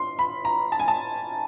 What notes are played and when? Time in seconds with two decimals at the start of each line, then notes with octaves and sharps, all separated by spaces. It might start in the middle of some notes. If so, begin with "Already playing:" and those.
Already playing: C6
0.19 B5
0.45 A#5
0.72 A5
0.80 G#5
0.88 A5